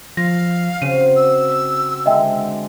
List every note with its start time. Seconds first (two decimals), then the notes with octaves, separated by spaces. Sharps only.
0.17 F3 F5 A#6
0.82 C#3 C4 F#4 D#7
1.16 E6
2.06 D3 G#3 D#5 E5 G5